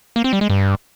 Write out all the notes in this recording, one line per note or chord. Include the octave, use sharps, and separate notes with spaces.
A#3
C4
G3
G#3
G2